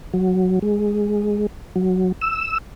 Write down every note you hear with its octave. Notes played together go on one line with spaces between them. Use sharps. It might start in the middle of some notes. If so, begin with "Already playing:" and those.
F#3
G#3
F#3
E6